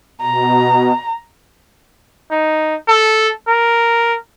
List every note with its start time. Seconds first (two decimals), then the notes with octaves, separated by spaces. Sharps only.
0.21 B2 A#5
2.31 D#4
2.88 A4
3.48 A#4